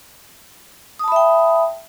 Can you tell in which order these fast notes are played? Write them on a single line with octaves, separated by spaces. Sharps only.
D#6 A5 B5 E5 G5